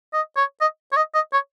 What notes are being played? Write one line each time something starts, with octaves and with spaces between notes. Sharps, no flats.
D#5
C#5
D#5
C#5
D#5
D#5
C#5